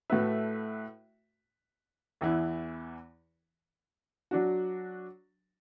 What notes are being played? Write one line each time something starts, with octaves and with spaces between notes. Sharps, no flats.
A2 A3 F#4 B4 E5
E2 E3 B3 E4
F#3 D4 F#4